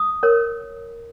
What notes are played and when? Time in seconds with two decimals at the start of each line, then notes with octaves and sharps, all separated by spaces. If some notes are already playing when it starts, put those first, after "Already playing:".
Already playing: D#6
0.23 A#4 C#5